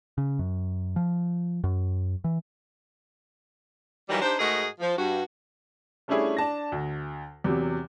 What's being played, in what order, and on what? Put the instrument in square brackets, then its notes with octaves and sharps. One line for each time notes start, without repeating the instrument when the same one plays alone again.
[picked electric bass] C#3
F#2
F3
F#2
E3
[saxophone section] D#3 E3 F#3 G3
D4 D#4 G4 C5
G#2 A3 F#4 G#4 A#4 D#5
F3
G2 F#4
[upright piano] G3 A3 C#4 D4 E4 G#4
D4 A5 A#6
D2
E2 C3 F#3